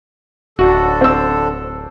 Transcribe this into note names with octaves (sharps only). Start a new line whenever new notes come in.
D1 D3 D4 F#4 A4
C4 E6